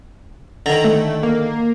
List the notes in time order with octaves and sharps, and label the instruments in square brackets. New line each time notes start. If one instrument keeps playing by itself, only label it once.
[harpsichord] D3 D#3 [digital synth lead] A#5
[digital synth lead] A3
A#3